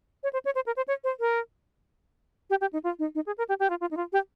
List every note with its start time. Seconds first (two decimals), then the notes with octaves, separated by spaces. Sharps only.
0.23 C#5
0.33 C5
0.45 C#5
0.55 C5
0.66 A#4
0.77 C5
0.88 C#5
1.04 C5
1.20 A#4
2.50 G4
2.61 G4
2.73 D#4
2.84 F4
2.99 D#4
3.15 D#4
3.26 G#4
3.38 A#4
3.49 G4
3.60 G4
3.70 F4
3.81 F4
3.91 D#4
3.97 F4
4.13 G4